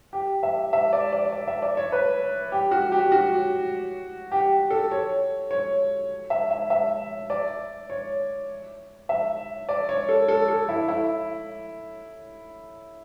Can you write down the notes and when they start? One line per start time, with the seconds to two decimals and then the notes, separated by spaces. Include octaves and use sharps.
0.13 G4
0.43 E5
0.73 E5
0.93 D5
1.13 D5
1.32 D5
1.48 E5
1.62 D5
1.77 C#5
1.92 B4
2.52 G4
2.71 F#4
2.92 G4
3.12 F#4
4.32 G4
4.70 A4
4.92 C#5
5.51 C#5
6.30 E5
6.51 E5
6.70 E5
7.30 D5
7.90 C#5
9.09 E5
9.69 D5
9.89 C#5
10.09 A4
10.28 A4
10.48 A4
10.69 E4
10.89 E4